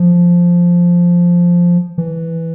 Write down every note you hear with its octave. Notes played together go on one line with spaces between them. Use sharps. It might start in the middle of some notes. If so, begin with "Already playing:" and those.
Already playing: F3
E3